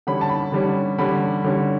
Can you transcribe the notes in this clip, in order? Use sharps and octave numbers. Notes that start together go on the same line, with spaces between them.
D3 G3 C#4 B5
A5
B5
D3 G3 C#4
D3 G3 C#4 B5
D3 G3 C#4